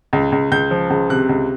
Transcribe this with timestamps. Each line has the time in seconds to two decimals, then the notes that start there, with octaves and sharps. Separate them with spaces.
0.13 C#2
0.32 C#2
0.52 C#2 G6
0.71 F3
0.90 C#2
1.10 C3 F#6
1.29 C#2